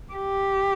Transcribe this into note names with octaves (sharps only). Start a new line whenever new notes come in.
G4